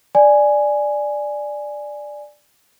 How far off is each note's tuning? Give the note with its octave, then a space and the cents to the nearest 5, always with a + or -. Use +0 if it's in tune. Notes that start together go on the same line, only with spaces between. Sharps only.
D5 +5 G#5 +0